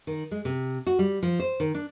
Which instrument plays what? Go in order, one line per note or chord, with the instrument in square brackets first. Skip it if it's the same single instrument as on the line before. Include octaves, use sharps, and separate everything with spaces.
[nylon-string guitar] D#3
G#3
C3
F#4
G3
F3
C5
D#3
D4